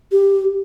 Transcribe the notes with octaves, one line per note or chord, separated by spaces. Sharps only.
G4